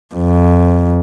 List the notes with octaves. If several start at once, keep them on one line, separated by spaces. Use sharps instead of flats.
F2